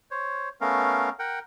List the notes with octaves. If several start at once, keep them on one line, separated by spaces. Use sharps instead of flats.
C5 C#5
A3 B3 C#4 A#4 F5
A#4 F#5 G5